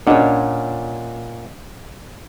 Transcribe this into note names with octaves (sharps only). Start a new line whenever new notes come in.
A#2 C#4 D4 C#5 D#5 F#5